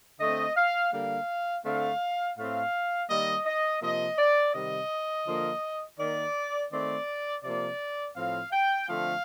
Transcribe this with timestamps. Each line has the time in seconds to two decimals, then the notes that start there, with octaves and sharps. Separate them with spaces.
0.20 D3 A3 C4 D#5
0.56 F5
0.93 D3 G3 A#3 F5
1.65 D3 A3 C4 F5
2.37 A2 A3 C4 F5
3.10 D#3 G3 A#3 D#5
3.46 D#5
3.82 C3 F3 A#3 D#5
4.18 D5
4.54 C3 D#3 G3 D#5
5.27 D3 F3 A#3
5.99 D#3 A#3 D5
6.71 D#3 A3 C4 D5
7.43 C3 F3 A#3 D5
8.16 A2 F3 C4 F5
8.52 G5
8.88 D3 F3 A3 C4 F5